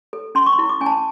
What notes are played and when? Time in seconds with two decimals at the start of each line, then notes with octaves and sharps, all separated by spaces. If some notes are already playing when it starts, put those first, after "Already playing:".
0.13 A4
0.35 C#4 C6
0.46 C#6
0.52 C6
0.58 E4
0.69 D6
0.81 C#4 G#5
0.86 A5